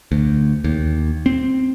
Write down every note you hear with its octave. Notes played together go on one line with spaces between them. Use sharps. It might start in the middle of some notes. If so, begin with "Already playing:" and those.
D2
D#2
C4